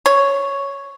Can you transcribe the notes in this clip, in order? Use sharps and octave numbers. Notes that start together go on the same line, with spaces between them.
C#5